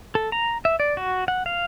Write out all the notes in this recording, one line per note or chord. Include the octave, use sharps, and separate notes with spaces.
A4
A#5
E5
D5
F#4
F#5
F5